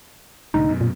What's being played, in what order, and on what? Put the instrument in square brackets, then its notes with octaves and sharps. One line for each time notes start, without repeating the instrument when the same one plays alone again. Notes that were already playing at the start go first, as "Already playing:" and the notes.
[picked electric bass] C2 A2 D3 [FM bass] D#4
[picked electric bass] F#2 B2
[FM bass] A#2